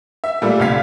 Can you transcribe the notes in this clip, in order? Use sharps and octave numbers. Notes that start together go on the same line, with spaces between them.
E5
A#2 G3 A3 F4 E6
C2 D3 F5 G#6 B6